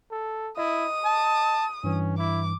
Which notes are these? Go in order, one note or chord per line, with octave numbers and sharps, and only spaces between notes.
A4
E4 D#5 D#6
A5
G2 E3 C#4
E4 D6